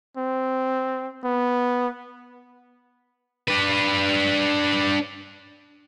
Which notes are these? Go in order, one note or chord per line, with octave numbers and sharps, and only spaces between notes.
C4
B3
D4 B4